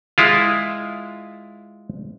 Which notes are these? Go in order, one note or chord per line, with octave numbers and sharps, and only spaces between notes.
G#3 E4 F4